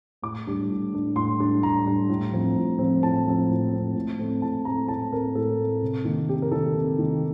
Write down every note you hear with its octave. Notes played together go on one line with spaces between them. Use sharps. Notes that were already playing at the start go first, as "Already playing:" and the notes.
A2 D6
G3 D4
A2
G3 D4
A2 C6
G3 D4
A2 A#5
G3 D4
A2
F3 C4
A2
F3 C4
A2 A5
F3 C4
A2
F3 C4
A2
A3 C4
A2 A5
A3 C4 A#5
A2 A5
A3 C4 A#4
A2 A4
A3 C4
C3
D#3 A#3
C3 G4
A#4
D#3 A#3 A4
C3
D#3 A#3